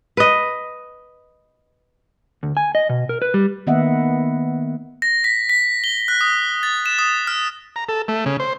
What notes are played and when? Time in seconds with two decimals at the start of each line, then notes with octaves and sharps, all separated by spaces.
0.17 B4 D#5
2.43 D2
2.57 G#5
2.75 D#5
2.89 B2
3.09 A#4
3.22 B4
3.34 G3
3.67 D#3 A#3 B3 D#5 E5 F#5
5.02 A#6
5.24 B6
5.49 B6
5.84 G7
6.08 F#6
6.21 D#6
6.63 A6
6.86 E7
6.99 D#6
7.27 F6
7.76 A#5
7.89 A4
8.08 A3
8.26 C#3
8.40 C5